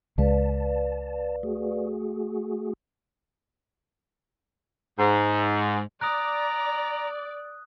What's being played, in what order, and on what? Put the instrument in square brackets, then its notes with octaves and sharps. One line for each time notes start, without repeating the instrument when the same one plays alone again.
[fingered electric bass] C#2 G#3 [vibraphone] B4 D5 F5 [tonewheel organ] A5
[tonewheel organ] A3 F#4 G#4
[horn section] G#2
[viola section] D5 [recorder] A#5 [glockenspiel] D#6 F#6